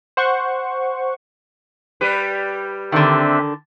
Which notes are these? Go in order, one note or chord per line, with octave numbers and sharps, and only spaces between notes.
C5 F#5 C#6
G3 G4 B4
D3 D#3 C4 D4 E5